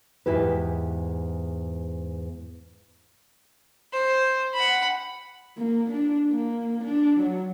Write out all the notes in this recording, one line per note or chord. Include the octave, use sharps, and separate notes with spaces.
E2 G#2 E4 G4 B4
C5
F#5 B5
A#3
D4
A#3
D4
F#3